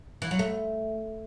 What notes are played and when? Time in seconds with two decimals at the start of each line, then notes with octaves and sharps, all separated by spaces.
0.22 E3
0.31 F#3
0.39 A3